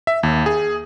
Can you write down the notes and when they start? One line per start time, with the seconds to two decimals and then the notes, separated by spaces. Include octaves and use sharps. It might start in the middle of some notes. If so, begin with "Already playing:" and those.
0.07 E5
0.23 D#2
0.46 G#4